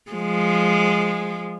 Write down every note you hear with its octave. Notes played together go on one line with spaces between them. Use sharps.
F3 G#3